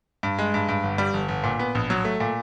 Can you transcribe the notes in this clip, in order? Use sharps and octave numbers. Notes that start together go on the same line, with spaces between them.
G2
G#3
G2
G2
G1
G3
G1
G1
A#2
B3
A#1
F#3
A3
A#2